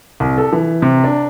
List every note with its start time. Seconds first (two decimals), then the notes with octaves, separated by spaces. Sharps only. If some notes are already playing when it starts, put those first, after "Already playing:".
0.20 C2
0.38 A4
0.53 E3
0.82 C3
1.04 D4